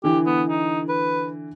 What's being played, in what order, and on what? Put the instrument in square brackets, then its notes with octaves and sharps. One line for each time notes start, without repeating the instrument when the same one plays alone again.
[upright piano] D3 E3 [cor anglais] G4
[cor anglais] B3
D#4
B4